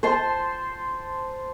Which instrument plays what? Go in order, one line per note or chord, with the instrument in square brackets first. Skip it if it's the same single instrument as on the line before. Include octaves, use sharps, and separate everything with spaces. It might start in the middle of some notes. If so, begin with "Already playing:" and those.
[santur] C5 A5 C6